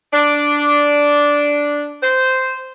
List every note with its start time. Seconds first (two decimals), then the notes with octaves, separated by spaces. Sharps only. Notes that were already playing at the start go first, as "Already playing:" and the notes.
0.12 D4
2.02 C5